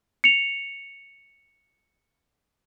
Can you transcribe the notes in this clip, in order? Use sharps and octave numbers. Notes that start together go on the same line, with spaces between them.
C#7 F7